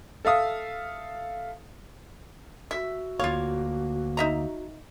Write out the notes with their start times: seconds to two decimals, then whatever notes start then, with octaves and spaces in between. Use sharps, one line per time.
0.25 A4 E5 F5 D#6
2.71 F#4 E5
3.20 D2 A#3 F4 C#5 F5
4.17 D#4 E5 A#5